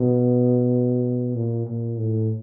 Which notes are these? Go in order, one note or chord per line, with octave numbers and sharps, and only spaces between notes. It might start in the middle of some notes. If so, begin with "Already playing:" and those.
Already playing: B2
A#2
A#2
A2